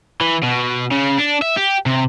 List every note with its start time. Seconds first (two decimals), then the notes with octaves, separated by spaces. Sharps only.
0.21 E3
0.43 B2
0.92 C#3
1.18 D4
1.42 E5
1.57 G4
1.86 C3